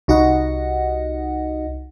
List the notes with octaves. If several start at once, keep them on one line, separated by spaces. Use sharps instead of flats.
C2 D#4 F#4 D#5 F#5